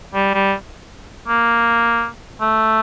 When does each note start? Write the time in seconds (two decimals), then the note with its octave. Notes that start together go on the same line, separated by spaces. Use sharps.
0.14 G3
0.34 G3
1.28 A#3
2.41 A3